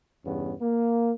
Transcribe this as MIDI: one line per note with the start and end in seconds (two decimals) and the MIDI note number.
0.25 0.55 40
0.25 0.55 43
0.25 0.55 49
0.25 0.55 59
0.25 0.55 61
0.61 1.13 58